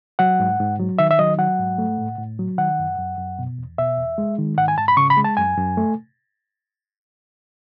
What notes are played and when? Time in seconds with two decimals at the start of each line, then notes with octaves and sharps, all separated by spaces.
0.19 F#3 F#5
0.40 G#2
0.59 G#2
0.79 F#3
0.99 D#3 E5
1.11 E5
1.19 F#3 D#5
1.39 F#3 F#5
1.59 G#2
1.78 A3
1.98 A2
2.18 A2
2.39 F#3
2.58 D#3 F#5
2.79 F#2
2.98 F#2
3.18 F#2
3.39 B2
3.58 E2
3.78 B2 E5
3.98 E2
4.18 G#3
4.38 D#3
4.58 G#2 F#5
4.68 G#5
4.78 G#2 A5
4.88 B5
4.97 C#3 C#6
5.10 B5
5.17 G#3
5.24 A5
5.37 F#2 G#5
5.57 F#2
5.77 A3